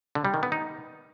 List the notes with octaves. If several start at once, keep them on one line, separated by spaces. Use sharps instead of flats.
D3
G3
D#3
B3
D#4